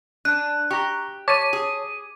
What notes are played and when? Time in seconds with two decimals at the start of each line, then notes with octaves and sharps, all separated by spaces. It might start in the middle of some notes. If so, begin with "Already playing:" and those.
0.25 D4 F#6
0.71 G4 A#5 C#6
1.28 C#5 A5 D6 D#7
1.53 G#4